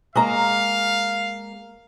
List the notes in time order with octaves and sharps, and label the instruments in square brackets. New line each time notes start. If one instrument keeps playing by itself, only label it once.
[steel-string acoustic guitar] G#3 A#3 A#5 [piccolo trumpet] F5